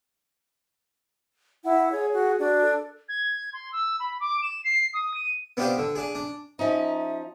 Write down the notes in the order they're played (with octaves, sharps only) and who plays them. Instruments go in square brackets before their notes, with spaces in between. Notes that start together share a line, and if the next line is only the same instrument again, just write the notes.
[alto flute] E4 [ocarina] F#5
[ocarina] G#4 [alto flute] C#5
[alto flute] F#4
[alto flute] D4 [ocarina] F#4
[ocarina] A4
[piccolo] G#6
C6
E6
B5
D6
E7
C7
D#6
D#7
[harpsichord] B3 C4 D4 F4 G4 C5
D3
D4 G#4
D4
[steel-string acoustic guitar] F3 C#4 D#4 [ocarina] E5